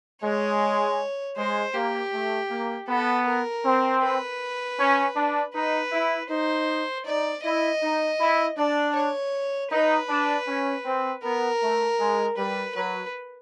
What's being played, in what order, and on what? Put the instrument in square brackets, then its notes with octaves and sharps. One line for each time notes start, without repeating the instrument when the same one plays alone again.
[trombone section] G#3 [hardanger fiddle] C#5
[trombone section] G#3 [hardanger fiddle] C5
[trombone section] A#3 [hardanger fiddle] G4
[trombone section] A3
A#3
[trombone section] B3 [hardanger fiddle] A4
[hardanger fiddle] A#4
[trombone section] C4
[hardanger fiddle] B4
[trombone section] C#4
D4
[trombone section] D#4 [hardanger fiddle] B4
[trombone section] E4
[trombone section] D#4 [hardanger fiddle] C5
[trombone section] D#4 [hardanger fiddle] D5
[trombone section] E4 [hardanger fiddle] D#5
[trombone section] D#4
E4
[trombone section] D4 [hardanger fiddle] D5
[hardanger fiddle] C#5
[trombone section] D#4 [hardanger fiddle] B4
[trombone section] D4
C#4
C4
[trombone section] B3 [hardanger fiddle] A#4
[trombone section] A3
G#3
[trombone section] G3 [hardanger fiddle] B4
[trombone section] F#3 [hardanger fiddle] B4